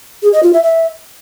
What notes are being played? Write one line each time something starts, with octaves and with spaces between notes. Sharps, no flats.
G#4
D#5
F4
E5
E5